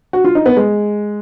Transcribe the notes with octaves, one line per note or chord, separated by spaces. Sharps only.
F#4
F4
D#4
B3
G#3